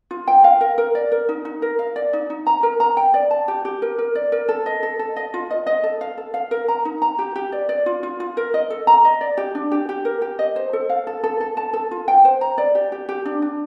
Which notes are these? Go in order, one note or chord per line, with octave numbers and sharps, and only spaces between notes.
F4
G5
F5
A#4
A#4
D5
A#4
D#4
D#4
A#4
F5
D5
D#4
D#4
A#5
A#4
A#5
G5
D5
A5
G4
G4
A#4
A#4
D5
A#4
A4
D#5
A4
A4
D#5
F4
D#5
D#5
A4
F5
A4
F5
A#4
A#5
D#4
A#5
G4
G4
D5
D5
F4
F4
F4
A#4
D#5
A4
A#5
D#5
D5
G4
D4
G4
G4
A#4
G4
D#5
C5
A4
F5
A4
A4
A4
A5
A4
F4
G5
C5
A#5
D5
G4
G4
G4
D4
D4